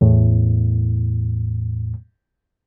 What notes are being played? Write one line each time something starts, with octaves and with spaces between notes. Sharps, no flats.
E2 A2